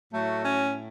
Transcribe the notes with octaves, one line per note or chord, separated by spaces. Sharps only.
A2 F#3 A3
C#4